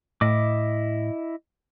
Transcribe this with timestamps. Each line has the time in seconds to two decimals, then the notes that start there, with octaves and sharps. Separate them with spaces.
0.21 A2 E4 D#5 D6